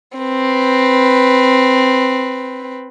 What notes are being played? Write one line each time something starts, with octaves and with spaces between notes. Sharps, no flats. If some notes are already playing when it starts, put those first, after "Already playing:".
C4 B4